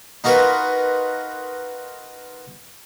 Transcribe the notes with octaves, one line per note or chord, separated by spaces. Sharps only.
D#4 F4 F#4 A#4 B4